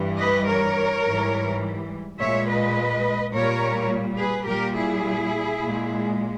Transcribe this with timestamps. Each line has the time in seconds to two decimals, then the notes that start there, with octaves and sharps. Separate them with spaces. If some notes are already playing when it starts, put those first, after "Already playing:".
Already playing: G2 E3 G3
0.19 B4 D#5
0.47 A#4 C#5
1.04 G#2 E3 G3
2.18 A#2 G#3 C#5 E5
2.47 B4 D#5
3.32 A#2 G3 A#4 C#5
4.18 G#4 B4
4.47 A#2 G3 G4 A#4
4.75 E4 G#4
5.61 A#2 G#3